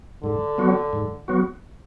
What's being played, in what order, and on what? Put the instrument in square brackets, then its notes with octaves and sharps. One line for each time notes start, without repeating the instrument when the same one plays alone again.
[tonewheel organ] G#2 [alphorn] D3
[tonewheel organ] F#3 B3 F#4
G#2
F#3 B3 F#4